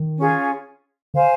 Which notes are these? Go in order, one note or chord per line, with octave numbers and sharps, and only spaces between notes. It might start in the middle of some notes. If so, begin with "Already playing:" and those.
Already playing: D#3
C#4 F4 G#4
D3 C5 F5 G#5